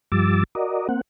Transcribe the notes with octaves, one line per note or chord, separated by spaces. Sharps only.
G2 F3 G3 D6 E6 A6
F#4 A#4 D5 D#5
A#3 C4 F#5